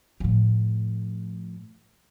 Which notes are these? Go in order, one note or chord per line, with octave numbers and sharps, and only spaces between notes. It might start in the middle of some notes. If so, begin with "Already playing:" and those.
A2 F3